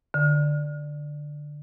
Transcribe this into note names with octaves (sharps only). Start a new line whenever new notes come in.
D3